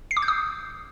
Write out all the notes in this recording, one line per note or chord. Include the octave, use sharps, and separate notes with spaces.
C7
D6
G6
D#6